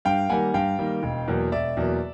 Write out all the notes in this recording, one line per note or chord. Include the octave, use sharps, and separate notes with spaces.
G2 F5 G5
D#3 G3 A#3 F#5 G#5
G2 F5 G5
D#3 G3 A#3
E1
E2 B2 F#3 A#3
E1 D5 E5
E2 B2 F#3 A#3